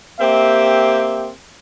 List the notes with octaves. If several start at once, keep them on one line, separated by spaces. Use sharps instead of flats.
A#3 C4 G4 E5